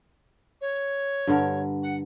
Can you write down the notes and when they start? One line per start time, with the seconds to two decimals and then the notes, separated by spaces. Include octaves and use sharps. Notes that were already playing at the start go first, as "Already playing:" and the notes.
0.61 C#5
1.27 G2 D3 A#4
1.83 F#5